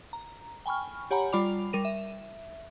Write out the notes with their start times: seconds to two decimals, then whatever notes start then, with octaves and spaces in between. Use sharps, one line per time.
0.13 A#5
0.66 G5 G#5 B5 C#6 F6
1.11 G4 C#5 F#5 G#5 A#5 B5
1.32 G3 F4 D5 B5 D6 F7
1.73 G3 A#4 D#7
1.85 E5